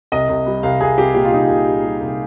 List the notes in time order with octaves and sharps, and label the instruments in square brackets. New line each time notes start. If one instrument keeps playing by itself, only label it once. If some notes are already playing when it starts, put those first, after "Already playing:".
[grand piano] C2 D#5
C2
G3
C2 F5
C2 G#4
C2 G4
A#2 G4
F4
C2 D#4
F4
C2
G3
G3
C2